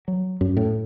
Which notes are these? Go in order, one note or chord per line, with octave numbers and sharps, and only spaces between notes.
F#3
F#2
A2